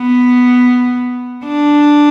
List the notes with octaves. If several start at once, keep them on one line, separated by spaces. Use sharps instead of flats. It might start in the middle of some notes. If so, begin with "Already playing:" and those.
Already playing: B3
D4